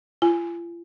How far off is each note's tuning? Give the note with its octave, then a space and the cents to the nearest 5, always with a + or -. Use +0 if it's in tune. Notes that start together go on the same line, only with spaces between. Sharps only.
F4 -40 G#5 +0